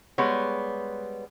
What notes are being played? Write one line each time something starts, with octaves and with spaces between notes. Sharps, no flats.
G3 G#3 B3 C#5